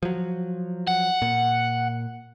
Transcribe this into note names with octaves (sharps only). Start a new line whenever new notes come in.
F3 F#3
F#5
A#2